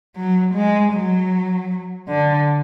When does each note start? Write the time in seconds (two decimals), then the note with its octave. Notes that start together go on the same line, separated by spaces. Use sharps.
0.16 F#3
0.54 G#3
0.93 F#3
2.08 D3